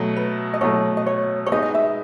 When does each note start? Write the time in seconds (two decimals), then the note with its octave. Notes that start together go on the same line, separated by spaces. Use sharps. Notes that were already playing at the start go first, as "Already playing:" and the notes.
Already playing: B2 F#3 A3
0.16 B4
0.54 D#5
0.61 B2 F#3 A3 C#5
0.97 D#5
1.06 C#5
1.46 C#5
1.52 G#3 B3 D#4 D#5
1.63 D#5
1.75 E5